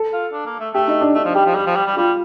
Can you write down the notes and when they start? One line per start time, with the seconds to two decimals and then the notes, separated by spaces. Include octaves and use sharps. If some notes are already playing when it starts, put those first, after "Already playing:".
Already playing: A4
0.13 F4
0.32 D4
0.46 A#3
0.60 A3
0.74 A3 G4
0.88 D#4
1.01 D4
1.15 A3 D4
1.25 F3
1.35 G3 G4
1.46 F3
1.55 G3 G4
1.67 F3
1.76 G3
1.86 G3
1.97 G3 F4